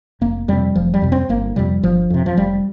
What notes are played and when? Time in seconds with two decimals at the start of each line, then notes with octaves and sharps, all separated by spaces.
0.21 F1 A#3
0.48 F2 C3 G3
0.75 F1 F3
0.94 G3
1.02 F2 C3
1.12 C4
1.29 G1 A#3
1.56 F2 C3 G3
1.83 G1 F3
2.10 F2 C3
2.26 F3
2.37 F1 G3